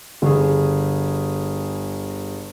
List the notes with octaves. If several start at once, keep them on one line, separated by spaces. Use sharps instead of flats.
G1 G#4